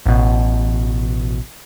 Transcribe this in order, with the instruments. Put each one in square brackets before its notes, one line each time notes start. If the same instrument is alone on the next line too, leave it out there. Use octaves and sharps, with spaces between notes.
[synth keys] A1 B2